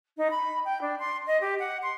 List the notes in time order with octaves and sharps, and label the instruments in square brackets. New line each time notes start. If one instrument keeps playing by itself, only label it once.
[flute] D#4
B5
G5
D4
C6
D#5
G4
F#5
C6